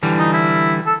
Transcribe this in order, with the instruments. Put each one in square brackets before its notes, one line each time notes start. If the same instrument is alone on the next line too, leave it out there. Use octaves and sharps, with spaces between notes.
[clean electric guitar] D3 E3 G3
[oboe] D#4
E4
A4